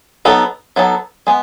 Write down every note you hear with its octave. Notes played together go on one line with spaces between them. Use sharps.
F#3 B3 D#4 A4
F#3 B3 D#4 A4
G#3 B3